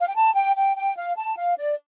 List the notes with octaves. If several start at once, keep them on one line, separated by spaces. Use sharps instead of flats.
F5
G5
A5
G5
G5
G5
F5
A5
F5
D5